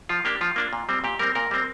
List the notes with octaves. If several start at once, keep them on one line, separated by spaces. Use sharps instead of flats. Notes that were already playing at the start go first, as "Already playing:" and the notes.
F3 F4
A#3 D4 G4
F3 F4
A#3 D4
A#2
G3 C4
A#2 G4
G3 C4 A#4
A#2 A#4
G3 C4